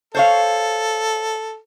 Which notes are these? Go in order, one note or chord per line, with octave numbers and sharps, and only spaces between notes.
A4 C5 C#5 F5